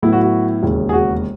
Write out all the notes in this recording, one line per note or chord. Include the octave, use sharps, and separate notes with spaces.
A2 F#3 B3 E4
F#4
F#4
E1 D#2 C#3
G#4
F#4